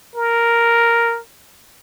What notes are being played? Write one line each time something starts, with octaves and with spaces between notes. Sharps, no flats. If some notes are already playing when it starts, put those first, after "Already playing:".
A#4